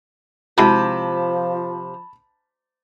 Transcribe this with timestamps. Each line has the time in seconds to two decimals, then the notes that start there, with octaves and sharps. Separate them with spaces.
0.58 C3 F3 G#3 E4 F#4 A5 B5